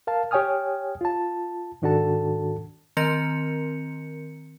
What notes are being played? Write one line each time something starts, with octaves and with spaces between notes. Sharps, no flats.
A#4 F5 A5
G4 C#5 G5 G#5 D#6 F6
F4 A5
G#2 D#3 D4 F#4 A4 A5
D#3 C4 A#4 C#7